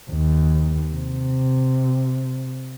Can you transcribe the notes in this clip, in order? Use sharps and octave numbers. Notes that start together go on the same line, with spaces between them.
D#2
C3